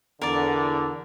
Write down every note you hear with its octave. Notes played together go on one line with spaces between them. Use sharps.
E2 D3 A#4 D5